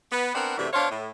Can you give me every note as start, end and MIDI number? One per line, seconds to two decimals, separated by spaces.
0.11 0.31 59
0.11 0.31 71
0.34 0.56 59
0.34 0.56 60
0.34 0.56 62
0.34 0.56 70
0.34 0.56 78
0.58 0.67 42
0.58 0.67 48
0.58 0.67 52
0.58 0.67 57
0.58 0.67 62
0.58 0.67 66
0.73 0.87 47
0.73 0.87 62
0.73 0.87 72
0.73 0.87 73
0.73 0.87 77
0.89 1.09 45